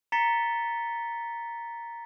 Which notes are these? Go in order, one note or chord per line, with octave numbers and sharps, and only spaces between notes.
A#5 A6 B6 C#7 G7